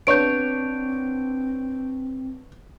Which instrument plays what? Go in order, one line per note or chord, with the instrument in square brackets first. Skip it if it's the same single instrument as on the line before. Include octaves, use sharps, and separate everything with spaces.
[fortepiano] B3 D4 C#5 [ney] C4 [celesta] G6 D7